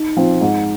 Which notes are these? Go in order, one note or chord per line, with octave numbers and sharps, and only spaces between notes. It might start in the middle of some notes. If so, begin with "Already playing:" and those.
Already playing: D#4
F3 C4
G#2